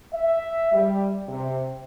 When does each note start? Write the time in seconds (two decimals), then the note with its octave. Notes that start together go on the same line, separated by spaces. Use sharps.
0.13 E5
0.72 G3
1.28 C3